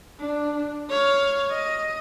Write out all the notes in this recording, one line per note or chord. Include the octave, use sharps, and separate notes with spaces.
D4
C#5 F5
D#5